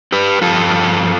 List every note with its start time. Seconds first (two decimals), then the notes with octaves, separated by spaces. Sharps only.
0.12 G4 B4
0.42 G2 F3 F4 A4